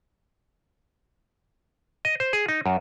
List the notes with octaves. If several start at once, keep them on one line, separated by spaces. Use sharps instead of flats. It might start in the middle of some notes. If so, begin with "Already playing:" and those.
D#5
C5
G#4
D#4
F#2